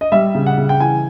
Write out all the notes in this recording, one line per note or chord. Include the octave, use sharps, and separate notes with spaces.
D#5
G3 E5
C#3
F#5
C#3
G5
E3 G#5